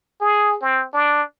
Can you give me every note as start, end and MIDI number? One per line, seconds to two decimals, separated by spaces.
0.21 0.56 68
0.61 0.86 60
0.93 1.23 62